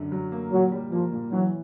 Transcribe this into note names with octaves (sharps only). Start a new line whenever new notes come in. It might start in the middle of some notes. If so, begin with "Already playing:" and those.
Already playing: F#2 D3
F#3
A#3
A#2 F#3
G3
F3 A#3
A#2
E3 F#3